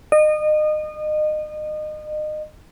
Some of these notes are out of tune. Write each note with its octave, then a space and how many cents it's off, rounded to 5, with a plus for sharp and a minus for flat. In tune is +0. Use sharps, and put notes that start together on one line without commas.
D#5 -30